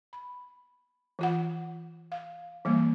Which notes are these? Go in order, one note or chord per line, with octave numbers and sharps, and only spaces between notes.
B5
E3 F4 F#5
F5
E3 G3 A#3